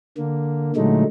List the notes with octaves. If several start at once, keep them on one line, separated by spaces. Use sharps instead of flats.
D3 A#3
A#2 D3 F#3 G#3 A3 D#4